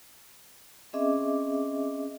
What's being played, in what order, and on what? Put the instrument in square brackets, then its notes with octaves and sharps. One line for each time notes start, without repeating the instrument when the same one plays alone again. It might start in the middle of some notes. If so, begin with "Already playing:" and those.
[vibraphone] C4 C#4 G#4 D#5 E5 D6